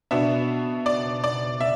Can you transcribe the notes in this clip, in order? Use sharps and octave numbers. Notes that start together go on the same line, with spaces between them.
B2 B3 D4 E5
D5
D5
E5